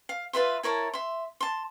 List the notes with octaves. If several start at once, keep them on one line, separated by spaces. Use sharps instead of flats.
F5
F4 B4 E5 C6
E4 A#4 C#5 A5
E5 C6
A5 C6